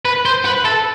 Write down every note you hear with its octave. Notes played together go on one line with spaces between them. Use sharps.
B4
C5
B4
A4